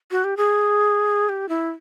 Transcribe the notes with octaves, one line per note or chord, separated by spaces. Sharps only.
F#4
G4
G#4
G4
E4